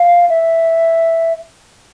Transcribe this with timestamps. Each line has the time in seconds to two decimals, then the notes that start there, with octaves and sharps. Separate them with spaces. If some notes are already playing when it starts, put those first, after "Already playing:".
Already playing: F5
0.29 E5